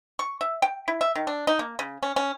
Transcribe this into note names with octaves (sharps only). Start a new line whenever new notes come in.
C#6
E5
G5
E4
E5
D#3
D4
D#4
A#3
C#3
C#4
C#4